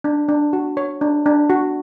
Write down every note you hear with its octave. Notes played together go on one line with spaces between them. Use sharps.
D4
D4
F#4
C#5
D4
D4
F#4